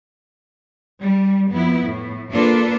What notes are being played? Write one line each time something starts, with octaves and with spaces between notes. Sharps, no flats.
G3
F2 B3 E4
A2
A#3 D4 F4 A4 B4